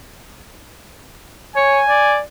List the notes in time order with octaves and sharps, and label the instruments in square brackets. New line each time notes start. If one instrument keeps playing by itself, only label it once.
[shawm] C#5 [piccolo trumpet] G#5
[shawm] D5